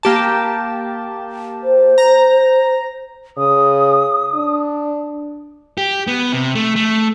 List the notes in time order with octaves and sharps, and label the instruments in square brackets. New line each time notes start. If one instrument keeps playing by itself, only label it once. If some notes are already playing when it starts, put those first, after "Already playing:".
[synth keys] A#3 G4 A5
[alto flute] C5
[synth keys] A#5
[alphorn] C#3 [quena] D#6
[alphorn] D4
[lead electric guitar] G4
B3
C3
A3
A3